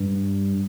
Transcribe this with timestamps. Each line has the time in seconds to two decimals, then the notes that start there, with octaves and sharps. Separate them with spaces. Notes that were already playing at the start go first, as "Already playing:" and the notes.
Already playing: G2